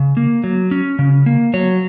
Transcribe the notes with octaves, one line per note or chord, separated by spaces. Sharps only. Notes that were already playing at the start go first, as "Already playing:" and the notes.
Already playing: C#3
A#3
F#3
C#4
C#3
A#3
F#3 C#5